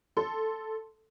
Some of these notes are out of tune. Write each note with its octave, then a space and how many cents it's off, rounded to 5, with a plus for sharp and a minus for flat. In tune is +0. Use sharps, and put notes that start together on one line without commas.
A4 +0 C6 +0